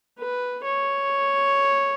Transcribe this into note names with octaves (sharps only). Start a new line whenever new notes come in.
B4
C#5